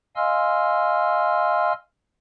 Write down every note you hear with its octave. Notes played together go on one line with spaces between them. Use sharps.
D#5 F5 G#5 C6 E6 F6